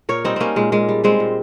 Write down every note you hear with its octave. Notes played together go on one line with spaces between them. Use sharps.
A#2 A#4 C#5
G3 C4 D#4
G3 A#3 C4 C#4
A#2 G#3
A#2 G#3
G3
G3 G#3 C4
A#2